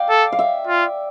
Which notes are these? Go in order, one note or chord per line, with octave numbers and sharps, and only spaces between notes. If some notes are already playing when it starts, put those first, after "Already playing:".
Already playing: D5 F5 G5
A4
F5
E5
F4